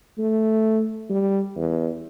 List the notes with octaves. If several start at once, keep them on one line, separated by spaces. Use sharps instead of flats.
A3
G3
E2